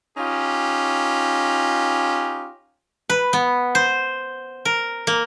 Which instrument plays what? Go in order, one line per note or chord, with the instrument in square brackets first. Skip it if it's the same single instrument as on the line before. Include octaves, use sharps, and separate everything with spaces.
[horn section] C#4 D#4 F4 G4
[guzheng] B4
B3
C5
A#4
A#3